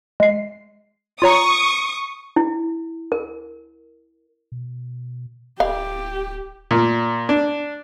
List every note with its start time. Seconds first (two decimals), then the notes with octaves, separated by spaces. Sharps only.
0.20 G#3 C7
1.22 F4 C#5 A#5 C#6 D#6
2.36 E4
3.12 A#4
4.52 B2
5.60 D1 G4 F5
6.71 A#2
7.29 D4